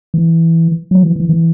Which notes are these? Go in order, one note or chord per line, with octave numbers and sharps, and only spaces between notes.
E3
F#3
E3
E3
E3